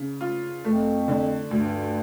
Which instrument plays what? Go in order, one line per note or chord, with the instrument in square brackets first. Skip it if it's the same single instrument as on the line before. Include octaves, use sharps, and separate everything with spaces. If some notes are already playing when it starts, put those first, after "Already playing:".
Already playing: [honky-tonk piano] C#3
F4
[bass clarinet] F2 [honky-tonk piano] A3
[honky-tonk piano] D3
[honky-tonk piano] D2 [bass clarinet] G2